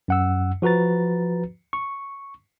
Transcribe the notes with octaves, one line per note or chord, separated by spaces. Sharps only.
F#2 F#5 E6
F3 F#4 B4 A#5 A6
C#6